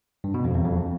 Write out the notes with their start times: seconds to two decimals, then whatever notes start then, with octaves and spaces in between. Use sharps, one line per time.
0.24 G2
0.34 B2
0.44 F2
0.55 E2
0.65 F2